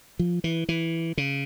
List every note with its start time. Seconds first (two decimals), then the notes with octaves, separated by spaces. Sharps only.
0.19 F3
0.44 E3
0.69 E3
1.17 C#3